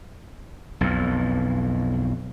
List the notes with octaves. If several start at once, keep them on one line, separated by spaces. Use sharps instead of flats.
B1 F2